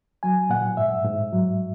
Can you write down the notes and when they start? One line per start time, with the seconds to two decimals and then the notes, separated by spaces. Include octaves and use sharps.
0.23 F#3 G#5
0.50 A#2 F#5
0.77 G#2 E5
1.04 G#2
1.32 F#3